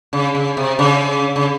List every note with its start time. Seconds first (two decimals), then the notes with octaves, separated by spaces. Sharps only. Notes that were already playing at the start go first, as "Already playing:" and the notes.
0.13 C#3
0.35 C#3
0.57 C3
0.79 C#3
1.36 C#3